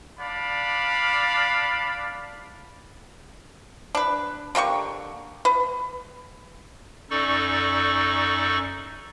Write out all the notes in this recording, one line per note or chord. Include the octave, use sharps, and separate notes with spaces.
D4 D5 F5 B5
D4 B4
D3 A#3 G4 C#6
B4
F#2 D#4 A4 D5 C#6